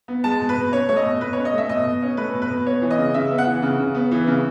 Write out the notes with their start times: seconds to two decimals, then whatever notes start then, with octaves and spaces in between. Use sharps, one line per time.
0.08 B3
0.24 G#3 A5
0.41 B2
0.49 B4
0.57 B2
0.72 C#4 C#5
0.89 A3 C#5
0.96 D#5
1.05 B2
1.21 B2 B4
1.33 C#4 C#5
1.45 D#5
1.53 A3 E5
1.69 B2 D#5
1.86 B2
2.02 C#4
2.17 A3 B4
2.34 B2
2.42 B4
2.50 B2
2.66 B3 C#5
2.82 E3
2.91 D#5
2.98 C#3
3.14 C#3 E5
3.31 B3
3.38 F#5
3.46 E3
3.62 C#3
3.79 C#3
3.95 B3
4.11 E3
4.27 C#3